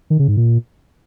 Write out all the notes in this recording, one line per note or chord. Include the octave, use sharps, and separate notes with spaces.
D#3
C#3
G#2
A#2